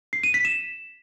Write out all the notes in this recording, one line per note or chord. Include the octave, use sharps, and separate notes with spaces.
C7
D#7
B6
E7